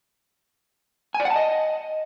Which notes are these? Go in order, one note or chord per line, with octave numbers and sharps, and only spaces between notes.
G#5
D5
F#5
A5
D#5